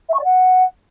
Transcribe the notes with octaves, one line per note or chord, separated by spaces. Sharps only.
E5
C#6
D5
F#5